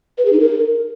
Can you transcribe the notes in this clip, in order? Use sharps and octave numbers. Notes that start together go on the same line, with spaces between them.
B4
G#4
D#4
A#4